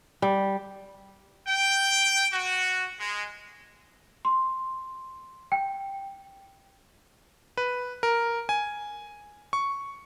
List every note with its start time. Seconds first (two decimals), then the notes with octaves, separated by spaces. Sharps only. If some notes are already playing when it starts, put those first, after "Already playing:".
0.22 G3
1.48 G5
2.33 F#4
3.00 G#3
4.25 C6
5.52 G5
7.57 B4
8.03 A#4
8.49 G#5
9.53 C#6